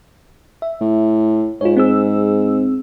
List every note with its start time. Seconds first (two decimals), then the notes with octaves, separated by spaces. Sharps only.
0.62 E5
0.81 A2
1.61 G#2 F4 C#5
1.77 C4 G#4 E6